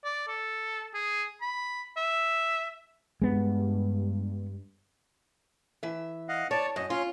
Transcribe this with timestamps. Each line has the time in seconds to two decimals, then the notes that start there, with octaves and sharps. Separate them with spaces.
0.04 D5
0.28 A4
0.94 G#4
1.41 B5
1.97 E5
3.22 G2 G#3 B3
5.83 E3 E5
6.29 D#5 F5 F#5
6.51 C#5 D5 A5
6.76 F#2 D#5
6.90 C#4 F4 C6